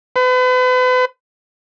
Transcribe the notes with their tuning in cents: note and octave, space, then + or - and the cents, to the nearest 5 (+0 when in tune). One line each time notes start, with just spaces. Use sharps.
B4 +40